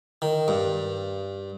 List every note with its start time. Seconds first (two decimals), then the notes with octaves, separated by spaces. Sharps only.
0.22 D#3
0.48 G2